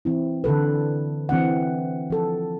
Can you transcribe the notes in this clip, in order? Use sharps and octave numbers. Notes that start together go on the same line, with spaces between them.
E3 C4 E4
D3 E3 A4 B4
E3 C4 D4 F#5
F3 A4